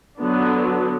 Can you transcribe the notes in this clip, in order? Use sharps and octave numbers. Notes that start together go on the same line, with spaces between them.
D3 F#3 B3 D4